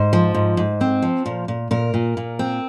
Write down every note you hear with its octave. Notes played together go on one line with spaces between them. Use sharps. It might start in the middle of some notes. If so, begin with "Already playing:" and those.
Already playing: G#2 C5
F3
G#2
G#2
C4
F3
A#2
A#2
A#2 A#4
A#2
A#2
C4